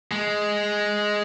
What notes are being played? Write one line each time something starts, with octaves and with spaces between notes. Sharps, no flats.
G#3